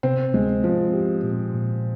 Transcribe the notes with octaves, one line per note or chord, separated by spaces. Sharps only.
C3 C4
D2 G#3
F3 C4
G4
A#2
A#2